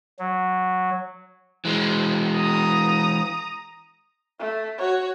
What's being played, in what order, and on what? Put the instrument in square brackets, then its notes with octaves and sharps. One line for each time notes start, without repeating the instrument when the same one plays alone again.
[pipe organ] F#3
[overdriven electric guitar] E3 G#3
[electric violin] A#5 D#6
[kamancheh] A3
F#4 C#5